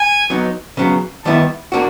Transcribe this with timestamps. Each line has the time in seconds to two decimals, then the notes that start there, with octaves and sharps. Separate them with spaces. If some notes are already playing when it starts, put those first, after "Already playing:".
Already playing: G#5
0.30 F#3 B3 D#4
0.77 C#3 F#3 B3
1.25 D#3 G3 B3 E4 A5
1.72 A#3 D4 F#4